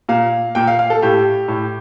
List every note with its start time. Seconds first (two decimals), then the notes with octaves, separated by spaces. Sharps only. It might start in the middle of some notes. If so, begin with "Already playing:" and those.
0.09 A#2 F5
0.55 A#2 G5
0.67 F5
0.79 F5
0.90 A4
1.02 A2 G4
1.48 A2